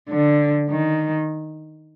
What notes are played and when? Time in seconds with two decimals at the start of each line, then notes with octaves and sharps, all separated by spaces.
0.09 D3
0.70 D#3